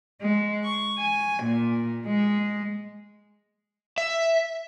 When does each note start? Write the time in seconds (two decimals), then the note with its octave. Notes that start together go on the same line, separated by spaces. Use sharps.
0.20 G#3
0.64 C#6
0.99 G#5
1.43 A#2
2.06 G#3
3.98 E5